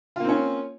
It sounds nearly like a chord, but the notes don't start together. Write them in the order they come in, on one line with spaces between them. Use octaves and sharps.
F4 A#3 C4 C#4